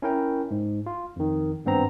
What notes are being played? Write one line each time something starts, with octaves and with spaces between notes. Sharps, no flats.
C#4 E4 A#4 G5
G#2
F4
F2 D#3
G#1 G2 B3 C4 A#5